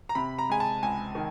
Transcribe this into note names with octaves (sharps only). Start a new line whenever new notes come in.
A#5
C3 B5
A#5
G#3 G#5
A5
C#2 G#5
D#3